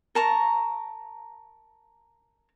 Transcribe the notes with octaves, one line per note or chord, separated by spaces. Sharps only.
A#4 A5 A#5 C#6